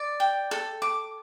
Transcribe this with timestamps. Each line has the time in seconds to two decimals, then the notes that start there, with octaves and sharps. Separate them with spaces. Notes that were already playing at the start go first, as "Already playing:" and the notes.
Already playing: D5
0.20 G5
0.51 A4
0.82 D6